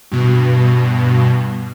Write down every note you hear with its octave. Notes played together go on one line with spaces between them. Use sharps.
G2 B2